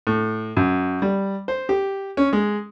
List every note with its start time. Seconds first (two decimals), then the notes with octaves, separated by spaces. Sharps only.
0.07 A2
0.57 F#2
1.02 G3
1.48 C5
1.69 G4
2.17 C#4
2.33 G#3